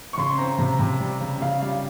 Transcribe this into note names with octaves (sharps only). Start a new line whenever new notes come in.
C#6
C#3 C6
C4 A#5
C3 A#5
C3
G3
C#3
C#3 F5
G3 F5